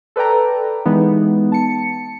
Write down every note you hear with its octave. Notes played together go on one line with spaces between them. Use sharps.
A4 B4 D5 G5 A#5
E3 G#3 B3 D#4
A5 C#7